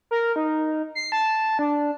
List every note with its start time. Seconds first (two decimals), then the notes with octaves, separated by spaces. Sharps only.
0.11 A#4
0.36 D#4
0.95 C7
1.12 A5
1.59 D4